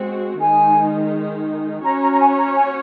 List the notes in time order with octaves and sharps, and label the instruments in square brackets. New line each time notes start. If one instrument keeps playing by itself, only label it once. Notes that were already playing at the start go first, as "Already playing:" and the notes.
Already playing: [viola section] G#3 C4 F#4
[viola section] D#3 G#3 D#4 [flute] G#5
[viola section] C#4 F#4 C#5 [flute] A#5
[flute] A#5
A#5
G#5
A#5
G#5